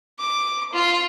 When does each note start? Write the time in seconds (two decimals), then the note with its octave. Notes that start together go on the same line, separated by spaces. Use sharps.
0.19 D6
0.73 F4